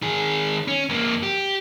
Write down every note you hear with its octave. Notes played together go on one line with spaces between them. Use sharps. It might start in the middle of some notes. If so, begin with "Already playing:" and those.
D#3 G#4
C#4
F2 A#3
G4